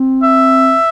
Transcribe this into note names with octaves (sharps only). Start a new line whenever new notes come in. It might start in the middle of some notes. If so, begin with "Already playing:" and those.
Already playing: C4
E5